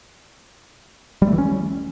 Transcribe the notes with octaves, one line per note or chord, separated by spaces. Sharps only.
G3
A3
E3
C#4